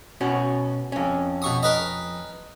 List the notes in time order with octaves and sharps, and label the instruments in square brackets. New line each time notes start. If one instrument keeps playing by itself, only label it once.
[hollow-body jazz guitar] B2 C#4 F#4
F2 C#4
[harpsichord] B2 C#6 D#6
A#4 B4 D#5